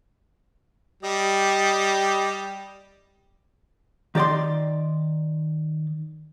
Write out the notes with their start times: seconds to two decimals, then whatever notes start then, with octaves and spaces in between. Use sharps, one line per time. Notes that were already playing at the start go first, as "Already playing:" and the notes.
1.03 G3 G4 D#5 D#6
4.15 D#3 G4 D5 D#5 C6